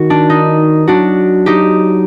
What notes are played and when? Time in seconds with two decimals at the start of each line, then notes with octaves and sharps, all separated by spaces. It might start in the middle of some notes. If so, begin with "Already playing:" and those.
Already playing: D#3 F#4
0.10 D4
0.30 D#4
0.87 F#3 D4 F#4
1.46 D#4 G4